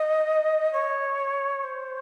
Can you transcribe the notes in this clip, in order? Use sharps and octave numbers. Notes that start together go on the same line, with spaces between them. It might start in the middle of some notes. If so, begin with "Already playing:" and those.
Already playing: D#5
C#5
C5